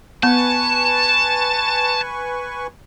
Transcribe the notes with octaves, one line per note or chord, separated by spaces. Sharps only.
B3 B4 G#5 A5 C#6